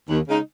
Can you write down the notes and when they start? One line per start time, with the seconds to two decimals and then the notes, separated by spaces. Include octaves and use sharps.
0.08 D#2
0.27 C#3 G#3 D#4